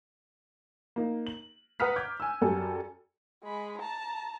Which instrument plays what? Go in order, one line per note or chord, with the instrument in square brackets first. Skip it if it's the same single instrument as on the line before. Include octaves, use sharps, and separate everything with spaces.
[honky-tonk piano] A#3 D#4
F#7
B4 F#5 A#5 D#6 F6 B6
D6 G6 G#6
G#5 E6
F#2 G3 A4 G#5
[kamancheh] G#3 B5
A5 A#5